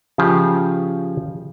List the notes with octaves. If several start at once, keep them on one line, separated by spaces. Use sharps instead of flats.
C#3 F3 G4 G#4